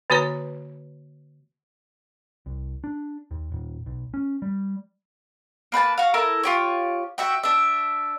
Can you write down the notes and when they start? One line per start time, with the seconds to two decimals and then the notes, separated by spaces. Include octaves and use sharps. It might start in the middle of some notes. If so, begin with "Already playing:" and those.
0.10 D3 A#3 F#4 B4 C#5 A#5
2.46 C2
2.84 D4
3.31 D#2
3.52 D#1
3.86 B1
4.14 C#4
4.42 G3
5.72 A#3 B4 G5 A5
5.98 F#4 F5
6.14 E4 A4 A#4
6.43 F4 G4 C#5
7.18 F#4 E5 G5
7.43 D4 E5